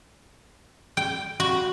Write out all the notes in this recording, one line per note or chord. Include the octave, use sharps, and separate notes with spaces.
G5
F#4